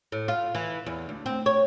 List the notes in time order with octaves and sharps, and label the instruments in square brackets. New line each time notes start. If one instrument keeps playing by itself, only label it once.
[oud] A2
F4
E3
E2
D2
C4
C#5